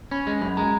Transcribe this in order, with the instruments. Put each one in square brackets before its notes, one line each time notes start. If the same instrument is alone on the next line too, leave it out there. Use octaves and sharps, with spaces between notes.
[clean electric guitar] C#4 [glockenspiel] B5
[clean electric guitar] G#3
[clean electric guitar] F#2 [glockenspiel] B5
[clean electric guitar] G#3 [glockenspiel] A#5